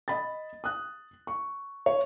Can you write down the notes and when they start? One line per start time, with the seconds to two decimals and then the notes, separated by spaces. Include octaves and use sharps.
0.08 D#5 B5 A6
0.64 D#6 F#6
1.27 C#6
1.86 C#5